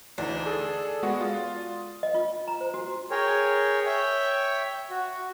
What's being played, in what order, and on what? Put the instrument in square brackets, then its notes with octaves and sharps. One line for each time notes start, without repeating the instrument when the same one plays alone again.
[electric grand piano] D2 E3 D#4 [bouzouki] D4
[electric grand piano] G#4 A4
G#3 B3 F#4
F4 D#6
[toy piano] D#5
F4
A#5
C5
F#4
[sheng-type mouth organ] G#4 A#4 C#5 G5
C#5 E5 G5
F#4